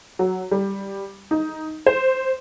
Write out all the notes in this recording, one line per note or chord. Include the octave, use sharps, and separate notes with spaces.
F#3
G3
D#4
C5